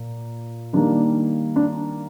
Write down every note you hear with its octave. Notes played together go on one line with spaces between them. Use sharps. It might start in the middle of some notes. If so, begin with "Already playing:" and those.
Already playing: A#2 A#3
D#3 G3 A#3 D4
D4